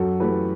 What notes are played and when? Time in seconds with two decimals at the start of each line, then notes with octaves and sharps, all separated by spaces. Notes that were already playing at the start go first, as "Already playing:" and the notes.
Already playing: F#2 F#4 A4
0.20 E3 A3 G4 B4